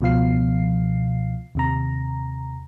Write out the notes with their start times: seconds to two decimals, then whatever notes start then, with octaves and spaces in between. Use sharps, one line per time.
0.01 C#2 B2 F3 F5 C7
1.55 D#2 C3 A#5